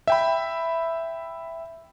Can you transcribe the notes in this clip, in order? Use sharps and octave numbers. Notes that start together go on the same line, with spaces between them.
E5 G5 B5